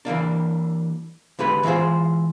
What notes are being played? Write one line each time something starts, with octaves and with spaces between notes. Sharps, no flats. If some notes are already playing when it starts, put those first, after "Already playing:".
E3 G3 A#3 D4
D3 G#3 G4 B4
E3 G#3 F4 G#4 C5